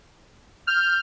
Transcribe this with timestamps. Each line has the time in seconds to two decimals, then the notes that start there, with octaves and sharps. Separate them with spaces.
0.67 F6 G6